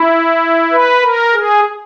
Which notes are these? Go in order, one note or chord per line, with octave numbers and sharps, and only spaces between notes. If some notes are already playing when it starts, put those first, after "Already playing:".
Already playing: E4
B4
A#4
G#4